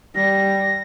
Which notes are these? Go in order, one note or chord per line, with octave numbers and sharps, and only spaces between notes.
G3 A#6